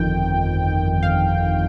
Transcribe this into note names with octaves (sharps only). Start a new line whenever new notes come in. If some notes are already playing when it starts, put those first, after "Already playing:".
Already playing: G1 F2 D#3 G5
F5